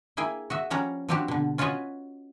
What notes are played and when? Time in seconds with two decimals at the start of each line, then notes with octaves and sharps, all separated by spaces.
0.17 A#3 E4 G#4 G5 G#5
0.50 F#4 D#5 E5
0.70 F3 G3 C#4 F#5 A#5
1.09 F3 G3 C4 D4 F#4 G4
1.28 B2 D3
1.58 C#4 F4 F#4 B4 C#5 D#5